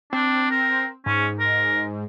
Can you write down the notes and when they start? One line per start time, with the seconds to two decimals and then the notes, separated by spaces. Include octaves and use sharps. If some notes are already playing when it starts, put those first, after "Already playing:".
0.13 C4 D4
0.51 A#4
1.06 G#2 C#4
1.40 A#4